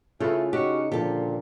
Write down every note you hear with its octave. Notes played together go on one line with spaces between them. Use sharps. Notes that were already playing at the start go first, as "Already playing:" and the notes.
C#3 A3 F4 B4
C#4 D#4 F#4 G4
A#2 D3 F3 G4 A4